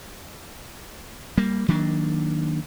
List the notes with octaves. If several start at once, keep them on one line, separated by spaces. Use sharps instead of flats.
G3 A#3
D#3 F#3 A#3 D4